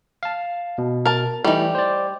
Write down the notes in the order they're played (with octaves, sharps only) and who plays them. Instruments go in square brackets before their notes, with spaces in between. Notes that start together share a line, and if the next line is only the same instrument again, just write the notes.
[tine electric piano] F5 A5
B2
[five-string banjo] A#4 A5
[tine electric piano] E3 A3 [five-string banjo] G3 D#4
[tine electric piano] C5 D5